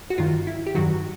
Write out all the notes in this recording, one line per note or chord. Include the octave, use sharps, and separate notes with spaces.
F#4
G2 D#3 F4
E4
G4
G2 D#3 F#3 F#4